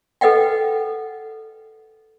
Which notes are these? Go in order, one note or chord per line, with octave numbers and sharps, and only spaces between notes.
A4 B4 D#5 F#5 G5